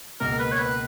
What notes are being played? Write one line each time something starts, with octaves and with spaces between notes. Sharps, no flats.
C#2 B2 A#3 A#4
B4
C#5
B4